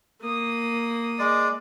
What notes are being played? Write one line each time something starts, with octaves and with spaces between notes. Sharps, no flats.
A#3 D#6
G#3 D5